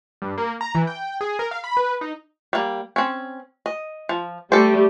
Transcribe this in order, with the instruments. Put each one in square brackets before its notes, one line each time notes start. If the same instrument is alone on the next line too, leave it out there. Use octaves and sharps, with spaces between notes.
[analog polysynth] G2
A#3
A#5
E3
G5
G#4
A#4
F5
B5
B4
D#4
[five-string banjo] G3 A#3
C4 C#4
D#5
F3
[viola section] G3 A3 G4 [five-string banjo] A4 C5